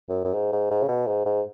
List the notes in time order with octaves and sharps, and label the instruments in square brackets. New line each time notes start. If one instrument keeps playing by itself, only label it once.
[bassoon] F#2
F#2
G#2
G#2
G#2
C#3
B2
G#2
G#2